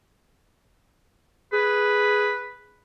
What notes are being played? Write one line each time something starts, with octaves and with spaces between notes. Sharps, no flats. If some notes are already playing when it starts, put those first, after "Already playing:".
G#4 B4